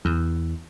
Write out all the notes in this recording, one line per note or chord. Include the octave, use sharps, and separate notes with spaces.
E2